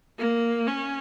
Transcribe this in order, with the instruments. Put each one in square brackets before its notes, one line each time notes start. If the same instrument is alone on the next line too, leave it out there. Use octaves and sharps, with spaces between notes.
[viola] A#3
C#4